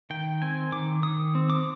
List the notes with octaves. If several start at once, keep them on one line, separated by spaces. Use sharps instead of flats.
D#3 G5
C4 G#5
D#3 D6
D#3 D#6
C4
D6